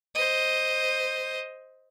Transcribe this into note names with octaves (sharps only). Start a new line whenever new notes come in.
C5 D#5